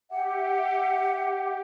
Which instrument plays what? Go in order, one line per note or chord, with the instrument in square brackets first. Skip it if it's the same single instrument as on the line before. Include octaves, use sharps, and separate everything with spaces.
[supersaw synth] G4 [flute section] E5 F#5